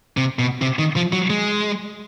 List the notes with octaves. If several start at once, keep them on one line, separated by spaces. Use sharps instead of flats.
C3
B2
C3
D#3
F3
F#3
G#3